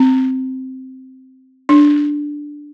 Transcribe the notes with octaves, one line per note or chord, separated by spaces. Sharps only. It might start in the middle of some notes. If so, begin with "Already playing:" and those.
Already playing: C4
D4